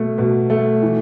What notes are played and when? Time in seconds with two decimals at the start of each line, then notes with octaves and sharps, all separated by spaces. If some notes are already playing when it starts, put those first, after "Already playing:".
Already playing: B2 A3
0.18 B2
0.50 A3
0.83 E3